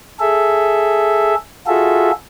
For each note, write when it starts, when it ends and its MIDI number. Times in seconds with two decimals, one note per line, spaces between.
0.20 1.35 68
0.20 1.35 69
0.20 1.35 76
1.67 2.11 65
1.67 2.11 66
1.67 2.11 68
1.67 2.11 69
1.67 2.11 76